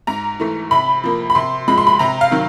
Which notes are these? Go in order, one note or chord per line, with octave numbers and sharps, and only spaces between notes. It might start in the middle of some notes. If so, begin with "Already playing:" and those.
G#2 A#5
E3 A3
C3 B5
F3 A#3
B5
C3 C6
F3 G#3 B5
C6
B5
C3 A#5
F5
D#3 F#3